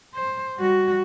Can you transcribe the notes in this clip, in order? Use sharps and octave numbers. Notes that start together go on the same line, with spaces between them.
C5
G3 F#4